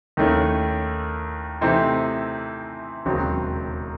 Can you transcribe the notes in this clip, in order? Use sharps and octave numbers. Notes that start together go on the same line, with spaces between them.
D#2 D#3 A3 C#4 E4
C3 E3 A3 C4 D#4
E1 D#2 C#3 F#3 C4